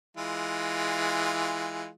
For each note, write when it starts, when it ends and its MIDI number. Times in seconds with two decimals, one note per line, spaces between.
0.17 1.88 52
0.17 1.88 56
0.17 1.88 65